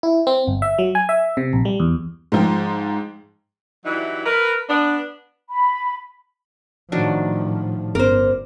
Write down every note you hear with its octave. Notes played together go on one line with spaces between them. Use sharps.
E4
C4
G1
E5
F#3
G#5
E5
C3
A#1
G3
E2
G#2 F3 G5
E3 F#3 G3 D#4 E4
A#4 B4
B3 D4
B5
A2 D#3 F3 F#3 D4
G1 C#4 A#4 C5 D6